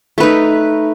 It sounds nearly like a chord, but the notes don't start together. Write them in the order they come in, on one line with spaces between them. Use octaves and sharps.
A3 B4 D#4